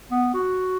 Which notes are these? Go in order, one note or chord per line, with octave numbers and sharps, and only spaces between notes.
B3
F#4